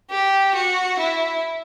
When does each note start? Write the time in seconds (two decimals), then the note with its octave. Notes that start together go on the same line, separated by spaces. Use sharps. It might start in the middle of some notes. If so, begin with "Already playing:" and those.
0.11 G4
0.55 F#4
1.00 E4